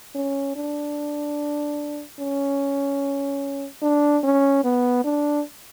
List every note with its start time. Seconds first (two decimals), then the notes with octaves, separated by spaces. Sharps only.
0.15 C#4
0.56 D4
2.20 C#4
3.82 D4
4.23 C#4
4.64 B3
5.05 D4